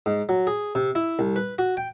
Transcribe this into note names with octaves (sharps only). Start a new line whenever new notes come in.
G#2
F#3
G#4
C3
E4
C2
B4
F#4
G5